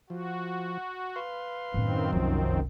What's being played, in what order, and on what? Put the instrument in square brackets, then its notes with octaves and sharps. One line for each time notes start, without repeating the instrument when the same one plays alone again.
[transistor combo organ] F3 [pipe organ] F#4
[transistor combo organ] B4 F5 C6
[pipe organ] F#2 D#3 C4 [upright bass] A2 D4
[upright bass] F1 C2 [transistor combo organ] F3